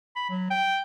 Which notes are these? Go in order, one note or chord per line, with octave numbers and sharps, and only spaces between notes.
B5
F#3
G5